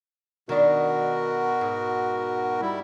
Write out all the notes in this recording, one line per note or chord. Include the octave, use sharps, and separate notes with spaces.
B2 D#3 D4 F#4 A#4
G#2
G3 E4